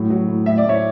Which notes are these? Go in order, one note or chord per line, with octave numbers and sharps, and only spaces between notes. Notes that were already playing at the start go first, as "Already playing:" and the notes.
Already playing: A2 F#3
F#3
A2
A2 E5
D5
A2 C#5 E5